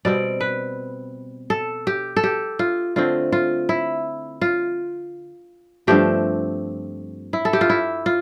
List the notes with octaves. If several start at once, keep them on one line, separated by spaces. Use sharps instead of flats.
B2 G3 C4 D5
B4
A4
G4
A4
G4
F4
D3 A3 C4 F4
F4
E4
F4
G2 F3 A3 C4 G4
E4
A4
G4
F4
E4
F4